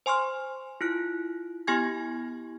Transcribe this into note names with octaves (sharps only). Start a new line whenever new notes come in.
C5 G#5 C6 C#6 F6
E4 F4 F#6
B3 E4 G4 G#5 C#6 G#6